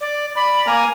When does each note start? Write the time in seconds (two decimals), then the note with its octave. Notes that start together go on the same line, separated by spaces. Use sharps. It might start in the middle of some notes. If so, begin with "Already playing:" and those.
0.01 D5
0.36 D5 B5
0.67 A#3 A#4 G#5 A#5